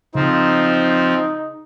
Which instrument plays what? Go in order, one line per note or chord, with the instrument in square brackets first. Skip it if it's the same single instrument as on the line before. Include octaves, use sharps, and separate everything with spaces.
[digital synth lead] C#3 [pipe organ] F3 C4 [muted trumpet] D#4